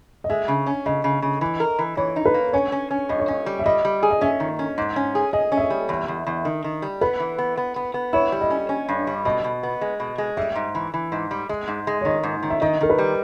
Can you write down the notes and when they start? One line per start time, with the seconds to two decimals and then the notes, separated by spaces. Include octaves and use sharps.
0.24 D#5
0.30 G#3 E5
0.48 C#3
0.66 C#4
0.86 C#3 D#5
1.04 C#3
1.22 C#3
1.41 E3
1.60 A#4
1.79 E3
1.97 E3 C#5
2.16 D#4
2.26 B4
2.34 A#3
2.53 C#4 C#5
2.72 C#4
2.91 C#4
3.09 G2 D#5
3.19 C#5
3.28 C#4 D#5
3.46 G3
3.59 E5
3.66 G3 D#5
3.85 G3
4.03 G#4
4.11 D#5
4.21 C#4 E5
4.40 D#3
4.59 C#4
4.78 G#2
4.96 C#4
5.15 G#4
5.33 G#4 D#5
5.52 C#4
5.57 E5
5.61 D#5
5.70 G3
5.89 E2
6.08 E2
6.27 E2
6.45 D#3
6.64 D#3
6.82 G3
7.01 B3 B4
7.20 E3
7.38 B3
7.58 B3
7.76 B3
7.94 B3
8.13 E4 C#5
8.32 G3
8.41 D#5
8.51 C#4
8.69 C#4
8.89 G2
9.07 G3
9.25 B2 D#5
9.44 B2
9.63 B3
9.81 G#3
10.00 B2
10.18 G#3
10.37 G3 E5
10.55 G#2
10.75 E3
10.94 E3
11.12 G#2
11.31 G3
11.49 G#3
11.68 G#2
11.87 G#3
12.01 C#5
12.05 D#3 D#5
12.23 G#2
12.43 D#3
12.50 E5
12.61 D#3 D#5
12.81 D#3 A#4
12.90 B4
12.98 G3